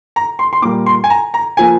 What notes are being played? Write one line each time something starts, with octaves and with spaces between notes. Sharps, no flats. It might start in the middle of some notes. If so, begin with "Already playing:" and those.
A#5
C6
C6
A#2 G3 A#3 D6
C6
G#5
A#5
A#5
F3 A#3 G#5